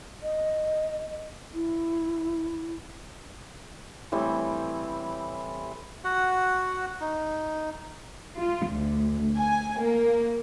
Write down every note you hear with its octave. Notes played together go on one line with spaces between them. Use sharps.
D#5
E4
A2 E3 G3 C4
F#4 F#5
D#4
F4
D2
G#5
A#3